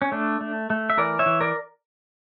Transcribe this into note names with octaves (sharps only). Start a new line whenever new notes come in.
C#4
A3 D4
A3
A3
E5
E3 A#4 D5
C#5 E5
E3
A#4 D5